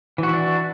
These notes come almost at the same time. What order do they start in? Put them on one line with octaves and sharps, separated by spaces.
E3 F#4 E4 D4